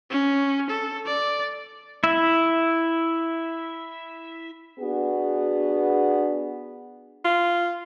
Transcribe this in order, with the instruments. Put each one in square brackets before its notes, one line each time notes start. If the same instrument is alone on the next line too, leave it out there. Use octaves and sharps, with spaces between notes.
[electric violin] C#4
A4
D5
[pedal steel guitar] E4 E5
[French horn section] B3 D4 F#4 G#4
[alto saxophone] F4